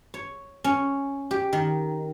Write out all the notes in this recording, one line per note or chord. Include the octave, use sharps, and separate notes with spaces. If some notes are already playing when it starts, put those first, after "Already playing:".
C#5
C#4
G4
D#3